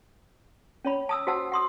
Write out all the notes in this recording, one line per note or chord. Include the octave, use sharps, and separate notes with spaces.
C#4 C#5 B5
A5 D#6 E6
F#4 C5 F#5 A5 E6
F#5 C6 D#6